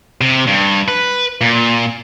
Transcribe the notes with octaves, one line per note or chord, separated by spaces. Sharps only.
C3
G2
B4
A#2